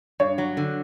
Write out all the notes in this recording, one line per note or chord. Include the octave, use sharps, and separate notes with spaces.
G2 C#5
F#3
D3